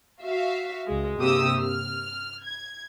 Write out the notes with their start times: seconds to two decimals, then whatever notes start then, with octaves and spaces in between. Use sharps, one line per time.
0.22 F#4 E5 F5
0.87 C#2 G#3
1.19 G2 C3 A#3 G4 D#6 E6
1.61 F6
2.43 G#6